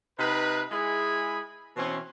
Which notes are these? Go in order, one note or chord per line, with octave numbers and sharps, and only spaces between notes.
C3 D#4 B4
G#3 E4 G#4 G#5 B5
B2 E3 C4 C#4